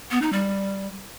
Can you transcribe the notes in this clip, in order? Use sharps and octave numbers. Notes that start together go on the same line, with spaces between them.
B3
D#4
G3